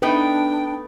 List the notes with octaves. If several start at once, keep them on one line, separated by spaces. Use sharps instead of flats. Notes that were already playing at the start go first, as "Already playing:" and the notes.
A3 B3 D4 D#4 B4 G5